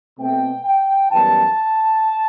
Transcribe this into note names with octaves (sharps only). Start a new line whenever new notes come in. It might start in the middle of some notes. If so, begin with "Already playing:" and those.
B2 A3 C4 G5
G5
F#2 E3 G3 B3 A5